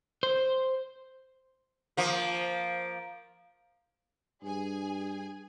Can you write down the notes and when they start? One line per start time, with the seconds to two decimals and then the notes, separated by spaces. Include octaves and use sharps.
0.23 C5
1.97 F3 A#3
4.43 G2 G#4 G#5